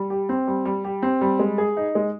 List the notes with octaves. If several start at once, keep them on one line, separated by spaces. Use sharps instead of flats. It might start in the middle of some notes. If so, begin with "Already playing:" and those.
Already playing: G3
G4
C4
G3
G3
G4
C4
G3
G#3
G#4
D#4
G#3